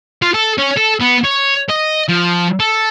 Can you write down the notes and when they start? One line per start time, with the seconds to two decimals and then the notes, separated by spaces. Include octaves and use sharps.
0.22 F4
0.34 A4
0.58 C#4
0.77 A4
1.01 B3
1.25 C#5
1.69 D#5
2.08 F3
2.60 A4